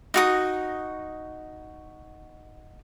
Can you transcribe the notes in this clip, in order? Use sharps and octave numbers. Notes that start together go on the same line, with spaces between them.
D#4 F#4 D#6